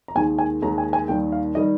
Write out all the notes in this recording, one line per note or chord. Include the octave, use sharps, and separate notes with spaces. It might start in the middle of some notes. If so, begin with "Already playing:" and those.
A#5
D#2 D#3 G#3 G#5
G#5
D#2 D#3 G#3 A#5
G#5
G#5
D#2 D#3 G3 G5
F5
D#3 G3 D#5